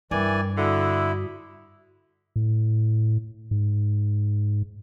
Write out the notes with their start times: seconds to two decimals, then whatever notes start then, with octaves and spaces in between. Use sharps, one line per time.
0.11 G2 E3 A#4 D5 G5 G#5
0.57 D3 E4 F#4 D#6
2.36 A2
3.51 G#2